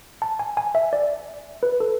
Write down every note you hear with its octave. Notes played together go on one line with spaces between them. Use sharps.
A5
G#5
G#5
E5
D5
B4
A4